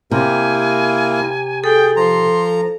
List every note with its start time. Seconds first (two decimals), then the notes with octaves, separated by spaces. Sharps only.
0.11 C3 A#3 E4 A#4 G#5
1.64 G#4 A4 G5
1.96 F3 A#5 C6